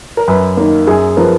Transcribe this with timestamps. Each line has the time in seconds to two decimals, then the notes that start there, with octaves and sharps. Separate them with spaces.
0.17 A#4
0.28 F#2 B4
0.57 D#3 A#3 A#4
0.87 F#2 G#4
1.17 F3 B3 A#4